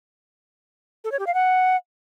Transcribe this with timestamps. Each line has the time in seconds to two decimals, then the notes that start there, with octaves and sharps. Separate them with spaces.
1.04 A4
1.12 C#5
1.19 G4
1.27 F5
1.34 F#5